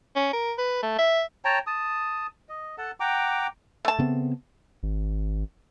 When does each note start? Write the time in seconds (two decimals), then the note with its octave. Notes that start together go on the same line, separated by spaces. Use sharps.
0.16 C#4
0.33 A#4
0.58 B4
0.83 A3
0.99 E5
1.45 C#5 G5 A5 A#5
1.67 A5 D#6
2.49 D#5
2.78 A4 F#5 A5
3.00 F#5 G5 A#5 D6
3.85 A3 A5
3.99 C#3 B3 C4
4.83 G#1